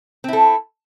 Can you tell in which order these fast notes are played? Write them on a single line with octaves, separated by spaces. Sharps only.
C4 E4 A4